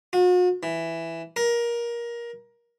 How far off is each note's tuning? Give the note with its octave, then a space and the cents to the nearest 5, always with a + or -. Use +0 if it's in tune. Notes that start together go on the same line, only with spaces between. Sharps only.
F#4 -45
E3 +5
A#4 +20